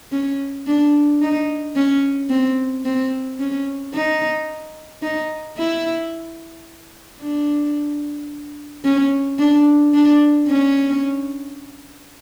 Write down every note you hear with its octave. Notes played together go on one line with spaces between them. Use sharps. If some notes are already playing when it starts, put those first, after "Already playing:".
C#4
D4
D#4
C#4
C4
C4
C#4
D#4
D#4
E4
D4
C#4
D4
D4
C#4